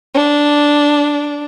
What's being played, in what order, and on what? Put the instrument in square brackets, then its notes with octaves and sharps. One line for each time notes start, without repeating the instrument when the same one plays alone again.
[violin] D4